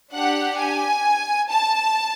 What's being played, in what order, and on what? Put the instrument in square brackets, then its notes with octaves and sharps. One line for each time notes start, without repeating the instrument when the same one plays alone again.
[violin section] D4 G4 F#5
G#5
A5